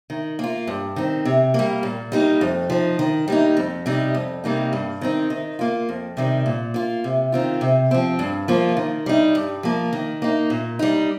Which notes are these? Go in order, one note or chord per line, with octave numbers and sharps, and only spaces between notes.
D#3
A#3 F4
G2
D#3 C4
C3
G3 A#3
A#2
G3 A#3 D#4
F2
F3 D#4
D#3
G3 A#3 D#4
F2
C3 G3 D#4
F2
C3 G3 A#3 D#4
G2
D#3 C4 D#4
D#3
A#3 F4
F2
C3 D#3 G3
A#2
A#3 F4
C3
D#3 C4 F4
C3
F3 C4
G2
F3 A#3 F4
D#3
G3 D#4
G2
F3 A#3
D#3
A#3 D#4
A#2
G3 D#4